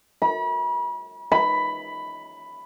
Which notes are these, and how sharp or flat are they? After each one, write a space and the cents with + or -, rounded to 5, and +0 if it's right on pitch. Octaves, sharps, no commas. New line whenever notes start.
B5 -40
B5 +5